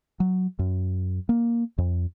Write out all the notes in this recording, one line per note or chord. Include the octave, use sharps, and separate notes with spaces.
F#3
F#2
A#3
F2